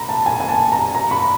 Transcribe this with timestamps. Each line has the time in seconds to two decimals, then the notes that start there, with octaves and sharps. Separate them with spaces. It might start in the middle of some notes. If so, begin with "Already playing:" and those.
Already playing: A#5 B5
0.09 A5
0.26 G#5
0.40 G#5
0.48 A5
0.72 A#5
0.95 A#5
1.11 B5